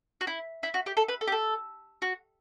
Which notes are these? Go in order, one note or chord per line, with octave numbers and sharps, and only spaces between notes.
F#4
E4
E4
F#4
G4
A4
B4
A4
G4
A4
F#4